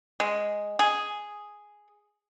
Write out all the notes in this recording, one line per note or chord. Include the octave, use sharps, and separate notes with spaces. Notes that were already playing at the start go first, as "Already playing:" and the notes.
G#3
G#4